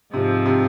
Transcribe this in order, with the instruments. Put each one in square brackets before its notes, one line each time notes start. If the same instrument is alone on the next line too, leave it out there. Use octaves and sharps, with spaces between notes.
[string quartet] G#2 F3 C4 [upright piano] C3
[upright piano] C3